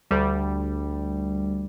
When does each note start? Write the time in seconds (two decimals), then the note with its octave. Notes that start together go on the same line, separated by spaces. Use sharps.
0.11 D2 G3